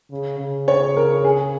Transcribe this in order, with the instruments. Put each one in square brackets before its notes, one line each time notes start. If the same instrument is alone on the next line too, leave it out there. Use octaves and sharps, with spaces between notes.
[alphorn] C#3
C#3
[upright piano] C#5
A#4
G#4